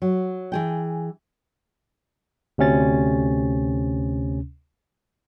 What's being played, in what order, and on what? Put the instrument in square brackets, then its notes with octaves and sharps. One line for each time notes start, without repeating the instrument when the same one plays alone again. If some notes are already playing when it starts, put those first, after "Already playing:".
[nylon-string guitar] F#3
E3 G#4 G5
[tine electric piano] D2 C3 C#4 A6